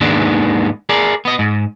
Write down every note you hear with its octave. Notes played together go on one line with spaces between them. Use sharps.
D#2 G#2 D#3 G#3 B3 D4
G#4 A#4 D5
B3 D#5
G#2